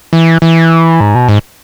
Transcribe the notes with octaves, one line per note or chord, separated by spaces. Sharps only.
E3
E3
G#2
B2
G#2